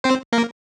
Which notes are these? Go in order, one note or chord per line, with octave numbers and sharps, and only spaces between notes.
C4 C5
A#3 A#4